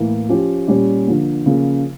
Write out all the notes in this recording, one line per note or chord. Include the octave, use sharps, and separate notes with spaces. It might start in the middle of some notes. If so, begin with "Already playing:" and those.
Already playing: A2 E3 A#3
F3 C#4 G4
A#2 G3 C#4 G4
D3 F3 A#3
C#3 F3 A#3